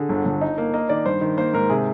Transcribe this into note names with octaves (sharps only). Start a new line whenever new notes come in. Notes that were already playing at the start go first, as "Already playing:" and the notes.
Already playing: D3 G#4
G1
G1
D#4
A#3
A#3 D#5
D#3 D5
G2 C5
D#3
A#3 C5
G#2 A#4
C3 G#4